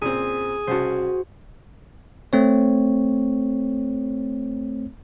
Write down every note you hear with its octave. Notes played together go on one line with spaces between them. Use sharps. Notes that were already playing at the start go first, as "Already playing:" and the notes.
A#2 C#3 C4 G#4
C2 C#3 F#4 C5 A5
A3 C4 C#5